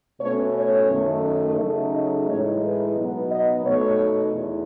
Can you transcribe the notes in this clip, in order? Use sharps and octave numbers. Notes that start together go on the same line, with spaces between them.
B2 A3 C#4 C#5
C#5
F#2 D#3 A3 D#4
C#3 F#3 A3 D#4
D#5
A2 E3 G#3 D#4 C#5
B4
B2 F#3 B3 D#4
D#5
B2 A3 D#4 C#5
E2